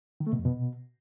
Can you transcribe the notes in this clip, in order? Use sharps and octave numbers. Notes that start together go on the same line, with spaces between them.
D#3
A3
B2
F2
B2